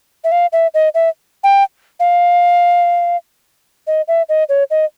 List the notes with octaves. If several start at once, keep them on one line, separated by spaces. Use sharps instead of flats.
E5
F5
E5
D#5
E5
G5
F5
D#5
E5
D#5
C#5
D#5